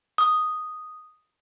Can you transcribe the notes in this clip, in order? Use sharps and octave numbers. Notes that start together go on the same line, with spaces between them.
D#6